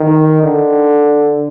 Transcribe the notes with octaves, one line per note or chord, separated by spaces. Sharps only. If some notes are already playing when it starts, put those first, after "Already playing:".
Already playing: D#3
D3